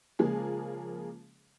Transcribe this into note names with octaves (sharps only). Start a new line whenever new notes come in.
C#3 F3 G#3 A#3 G#4